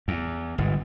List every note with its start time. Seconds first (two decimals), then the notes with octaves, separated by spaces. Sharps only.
0.08 E2
0.58 G1 G#2